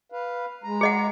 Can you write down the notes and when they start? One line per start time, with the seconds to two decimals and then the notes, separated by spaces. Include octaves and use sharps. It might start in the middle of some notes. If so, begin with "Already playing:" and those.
0.12 B4 F5
0.64 G#3 A#5
0.81 G#4 D#5 F#5